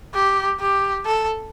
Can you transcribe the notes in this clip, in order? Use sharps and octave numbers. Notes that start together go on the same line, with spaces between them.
G4
G4
A4